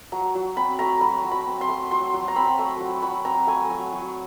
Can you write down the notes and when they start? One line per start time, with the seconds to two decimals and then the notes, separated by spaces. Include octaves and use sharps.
0.12 F#3 A#5
0.35 F#3
0.56 C4 B5
0.79 A3 A#5
1.01 F#3 B5
1.24 F#3
1.32 B5
1.46 C4
1.61 C6
1.68 A3
1.91 F#3 C6
2.13 F#3
2.28 A#5
2.36 C4 B5
2.59 A3
2.81 F#3
3.02 F#3 B5
3.25 C4 A#5
3.47 A3 G#5
3.70 F#3
3.93 F#3